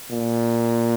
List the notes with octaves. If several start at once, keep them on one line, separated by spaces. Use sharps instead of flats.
A#2